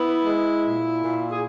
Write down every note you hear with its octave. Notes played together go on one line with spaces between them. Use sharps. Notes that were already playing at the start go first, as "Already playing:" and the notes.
Already playing: B3 E4
G#3
A#2
A#2
G#4